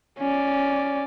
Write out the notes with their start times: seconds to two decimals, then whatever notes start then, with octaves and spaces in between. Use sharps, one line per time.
0.19 C#4 D5